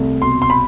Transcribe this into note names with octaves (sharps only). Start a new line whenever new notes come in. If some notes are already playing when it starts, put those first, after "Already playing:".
Already playing: C2 A3
B2 C6
C6
B5